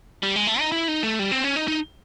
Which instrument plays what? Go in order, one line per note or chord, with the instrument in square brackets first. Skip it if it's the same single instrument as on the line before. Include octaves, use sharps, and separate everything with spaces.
[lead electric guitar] G3
G#3
A3
D#4
E4
D#4
A3
G3
C4
C#4
D#4
D#4